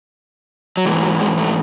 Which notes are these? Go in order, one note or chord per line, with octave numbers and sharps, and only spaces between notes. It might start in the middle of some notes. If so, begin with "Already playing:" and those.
F#3
G#2 E3 G#3
F#3
G#3
A3